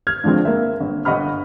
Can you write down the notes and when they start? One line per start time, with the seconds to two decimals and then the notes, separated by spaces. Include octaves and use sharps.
0.07 F6 G#6
0.24 G2 D3 F3 G#3 C4
0.45 A#3 E5
0.81 G1
1.05 G1 D#5 F#5 B5 F6